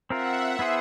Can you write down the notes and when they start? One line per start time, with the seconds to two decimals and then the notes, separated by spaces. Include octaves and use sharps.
0.10 C4 F4 A#4 E5 F#5
0.59 B3 E4 G#4 C5